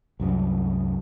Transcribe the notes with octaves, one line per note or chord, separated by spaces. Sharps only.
C2 F#2 G3